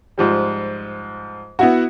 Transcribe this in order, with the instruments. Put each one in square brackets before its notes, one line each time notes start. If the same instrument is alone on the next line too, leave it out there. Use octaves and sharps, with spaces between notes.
[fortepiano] G#2 F3 G3
[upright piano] B3 E4 F#4